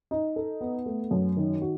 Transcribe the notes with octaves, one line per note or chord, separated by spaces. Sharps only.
D#4
A4
B3
A3
F#2
D#3
F#4